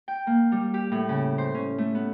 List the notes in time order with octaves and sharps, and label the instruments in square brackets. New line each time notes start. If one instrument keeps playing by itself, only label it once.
[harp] G5
A#3
G3
G4
A2
C#3
C5
C#4
A3
B3